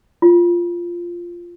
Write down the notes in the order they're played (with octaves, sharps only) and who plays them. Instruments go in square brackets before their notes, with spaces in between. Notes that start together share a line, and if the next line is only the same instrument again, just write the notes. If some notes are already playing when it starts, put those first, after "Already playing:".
[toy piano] F4